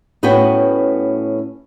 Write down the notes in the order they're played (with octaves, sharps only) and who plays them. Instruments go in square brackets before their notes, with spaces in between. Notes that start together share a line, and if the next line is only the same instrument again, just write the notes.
[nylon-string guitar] A2 B3 C#4 F#4 B4 G5